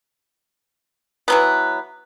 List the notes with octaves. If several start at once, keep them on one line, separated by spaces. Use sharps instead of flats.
E3 F#3 B3